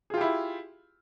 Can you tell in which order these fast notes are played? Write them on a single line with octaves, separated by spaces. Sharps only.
G#4 F4 G4 E4